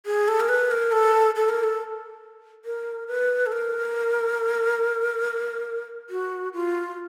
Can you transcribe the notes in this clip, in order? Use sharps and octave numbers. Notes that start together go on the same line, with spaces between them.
G#4
A4
A#4
B4
A#4
A4
A4
A#4
A4
A#4
B4
A4
A#4
F#4
F4